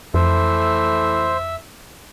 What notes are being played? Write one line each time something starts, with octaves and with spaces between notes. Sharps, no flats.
F2 E3 A3 C5 E5